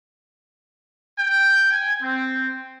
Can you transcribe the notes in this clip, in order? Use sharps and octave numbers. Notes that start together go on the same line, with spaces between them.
G5
G#5
C4